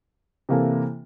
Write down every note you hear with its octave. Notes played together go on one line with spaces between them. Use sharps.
C3 E3 A#3 E4 A4